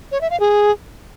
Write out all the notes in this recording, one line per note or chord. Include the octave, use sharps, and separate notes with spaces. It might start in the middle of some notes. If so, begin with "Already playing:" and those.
C#5
E5
F5
G#4